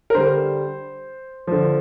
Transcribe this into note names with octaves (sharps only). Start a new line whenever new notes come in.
A#4
D3 G3 C5
D3 F3